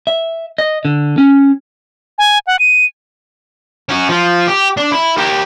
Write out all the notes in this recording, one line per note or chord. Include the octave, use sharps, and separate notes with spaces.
E5
D#5
D3
C#4
G#5
F#5
D#7
C#4 F#4
F3 F4
G4
D4
E4
G4 A#4